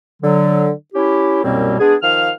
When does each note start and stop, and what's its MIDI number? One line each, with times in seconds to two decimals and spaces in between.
0.23 0.71 50
0.23 0.71 54
0.94 1.41 61
0.94 1.41 64
0.94 1.41 67
1.44 1.78 36
1.44 1.78 42
1.44 1.78 47
1.44 1.78 55
1.44 1.78 58
1.44 1.78 60
1.80 1.95 56
1.80 1.95 59
1.80 1.95 62
1.80 1.95 68
2.03 2.31 51
2.03 2.31 53
2.03 2.31 77
2.03 2.31 89